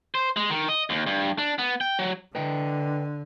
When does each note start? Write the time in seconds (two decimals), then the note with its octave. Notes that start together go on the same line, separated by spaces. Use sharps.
0.15 C5
0.37 G#3
0.50 D#3
0.68 D#5
0.90 D#2
1.07 G2
1.38 D4
1.59 B3
1.81 G5
1.99 F#3
2.35 D3 B4 D#5 G5